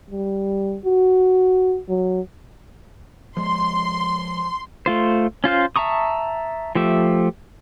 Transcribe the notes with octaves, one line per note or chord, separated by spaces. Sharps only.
G3
F#4
F#3
F3 G#3 C6
A3 F4 C5
C#4 F4 C5 F5
E5 A5 A#5 C#6 D#6
F3 A3 G4 E5